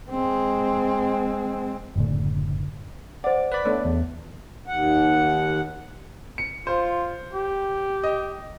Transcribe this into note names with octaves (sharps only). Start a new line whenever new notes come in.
G#3 C4
F#1 A2 D3
C5 D5 F#5
B4 D5 B5
A3 B3 D4 C#5
E2
D#2 F#5
C#7
F4 C5
G4
D#5